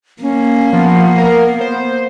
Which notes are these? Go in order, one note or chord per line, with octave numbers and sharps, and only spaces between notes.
A#3 C#4
F3 B3
A#4
C5